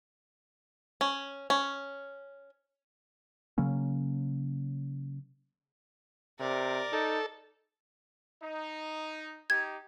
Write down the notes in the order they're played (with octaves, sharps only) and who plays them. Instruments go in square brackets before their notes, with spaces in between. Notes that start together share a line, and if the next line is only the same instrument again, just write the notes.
[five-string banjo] C#4
C#4
[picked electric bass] C#3 F#3 A#3 C#4
[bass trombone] C3 [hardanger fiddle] A#4 D5
[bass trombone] D#4 [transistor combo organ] A4
[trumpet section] D#4
[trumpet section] D#4 G4 [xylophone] G#6